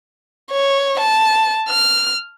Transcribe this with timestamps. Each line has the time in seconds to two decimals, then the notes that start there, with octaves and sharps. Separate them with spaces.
0.52 C#5
1.00 A5
1.69 F6